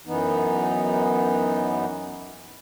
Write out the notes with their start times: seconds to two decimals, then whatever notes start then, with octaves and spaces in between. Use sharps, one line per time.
0.07 F#2 E3 B3 D#4